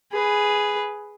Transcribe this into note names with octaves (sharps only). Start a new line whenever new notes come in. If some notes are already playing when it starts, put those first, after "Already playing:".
G#4 B4